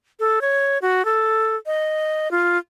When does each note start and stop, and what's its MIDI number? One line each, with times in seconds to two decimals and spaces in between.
0.20 0.39 69
0.41 0.78 73
0.82 1.05 66
1.05 1.56 69
1.66 2.31 75
2.31 2.58 65